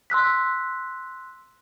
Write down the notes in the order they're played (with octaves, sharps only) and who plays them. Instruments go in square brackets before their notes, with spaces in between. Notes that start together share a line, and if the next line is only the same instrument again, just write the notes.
[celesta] C6 E6 F#6 B6